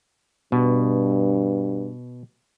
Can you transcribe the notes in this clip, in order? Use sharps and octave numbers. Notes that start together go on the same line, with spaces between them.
G2 B2